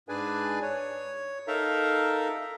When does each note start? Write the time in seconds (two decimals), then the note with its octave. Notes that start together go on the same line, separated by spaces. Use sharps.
0.09 G#2 D4 G#4 B4 D5 G#5
0.62 C#5
1.48 D#4 A4 A#4 E5 F5 A#5